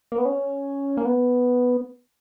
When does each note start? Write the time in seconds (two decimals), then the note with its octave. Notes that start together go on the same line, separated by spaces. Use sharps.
0.12 A#3
0.18 B3
0.25 C#4
0.97 A#3
1.05 B3